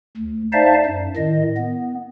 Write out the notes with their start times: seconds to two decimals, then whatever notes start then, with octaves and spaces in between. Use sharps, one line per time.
0.17 D2
0.53 D#4 C5 D5 E5 F5 A5
0.86 F#2
1.16 A2 D#3 D#5
1.57 B3